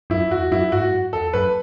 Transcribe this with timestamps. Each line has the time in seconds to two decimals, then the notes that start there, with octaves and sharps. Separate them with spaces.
0.10 F#2 E4
0.30 E2 F#4
0.52 F#2 E4
0.72 G#2 F#4
0.92 F#2
1.12 E2 A4
1.33 F#2 B4